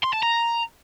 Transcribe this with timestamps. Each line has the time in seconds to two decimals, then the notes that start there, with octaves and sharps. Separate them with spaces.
0.04 C6
0.14 A5
0.23 A#5